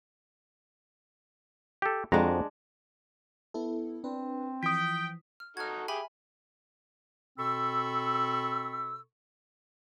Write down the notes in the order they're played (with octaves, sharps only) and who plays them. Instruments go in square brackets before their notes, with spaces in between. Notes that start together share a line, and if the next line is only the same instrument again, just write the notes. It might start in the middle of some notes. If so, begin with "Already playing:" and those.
[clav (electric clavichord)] G4 A4
[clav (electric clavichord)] F2 F#4 A#5 [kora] G#3 D4
[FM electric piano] B3 E4 A4
[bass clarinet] C4 [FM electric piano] D4 B4
[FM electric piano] E3 F3 [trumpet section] G5 [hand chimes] D#6 B6
[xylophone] F6
[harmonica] D#4 F#4 A4 [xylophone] F6 G#6
[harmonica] G4 G#4 [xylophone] E5 G#5 B5
[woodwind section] B2 C4 A4 B5 C#6 E6